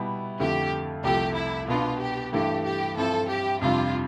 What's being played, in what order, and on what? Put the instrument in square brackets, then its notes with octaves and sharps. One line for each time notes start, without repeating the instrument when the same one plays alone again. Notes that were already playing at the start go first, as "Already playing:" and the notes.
Already playing: [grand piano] B2 G3 B3 E4
[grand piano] F2 D3 A3 E4 [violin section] G4
[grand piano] C2 C3 F3 A3 [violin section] G4
[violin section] E4
[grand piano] B2 B3 D4 [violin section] F4
[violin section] G4
[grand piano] G2 E3 A3 D4 [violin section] G4
[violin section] G4
[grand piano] G2 F3 C4 E4 [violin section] A4
[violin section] G4
[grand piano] F2 C3 G3 D4 [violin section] F4